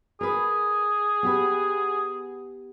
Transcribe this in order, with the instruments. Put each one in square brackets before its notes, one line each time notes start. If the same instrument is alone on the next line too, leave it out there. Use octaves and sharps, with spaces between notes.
[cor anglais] G#4 [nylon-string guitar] A#4 B4
[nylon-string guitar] B3 G4 B4